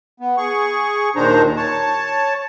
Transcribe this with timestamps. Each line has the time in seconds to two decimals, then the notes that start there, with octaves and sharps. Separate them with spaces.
0.20 B3
0.37 G#4 C#6
1.16 D#2 A#2 D#3 D4 C5 A#5
1.57 C#5 A5